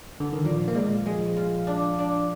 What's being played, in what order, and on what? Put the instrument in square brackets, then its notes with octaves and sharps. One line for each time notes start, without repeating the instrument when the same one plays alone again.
[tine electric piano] D3
D#3
[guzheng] A#2 [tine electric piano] F3
[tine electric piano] A#3
[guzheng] A#2 [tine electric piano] G#3
[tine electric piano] F3 [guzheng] G#3
[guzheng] F4
D4
D4